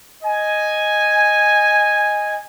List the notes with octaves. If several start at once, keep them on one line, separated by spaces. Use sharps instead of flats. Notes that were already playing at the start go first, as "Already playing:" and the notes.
D#5 G#5